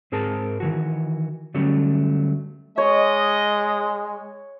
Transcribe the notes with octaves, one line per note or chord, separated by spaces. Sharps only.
G#2 C4 G#4 A#4 A5
D#3 E3 F#4
D3 F#3 G3 A3 C#4
G#3 C#5 D#5